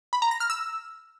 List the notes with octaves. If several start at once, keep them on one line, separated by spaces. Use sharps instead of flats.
B5
A#5
A#6
F6
E6